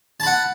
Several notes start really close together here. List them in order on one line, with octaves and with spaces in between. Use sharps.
A5 B5 F#5